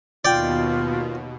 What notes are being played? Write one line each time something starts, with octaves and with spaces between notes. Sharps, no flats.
D#2 B2 F4 D5 G5